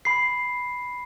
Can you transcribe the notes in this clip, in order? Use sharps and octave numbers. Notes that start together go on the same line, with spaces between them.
B5 C7